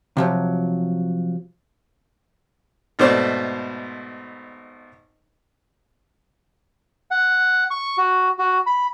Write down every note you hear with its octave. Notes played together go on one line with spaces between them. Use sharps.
C3 F3 F#3
G#1 B2 A3 C5 D5
F#5
C#6
F#4
F#4
B5